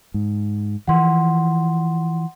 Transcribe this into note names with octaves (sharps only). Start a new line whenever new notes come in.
G#2
E3 F3 F#5 C6